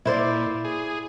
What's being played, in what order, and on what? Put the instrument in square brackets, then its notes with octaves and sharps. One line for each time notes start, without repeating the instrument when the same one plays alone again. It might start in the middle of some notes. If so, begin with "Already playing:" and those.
[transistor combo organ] A#2 [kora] E4 C5 D5
[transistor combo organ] G#4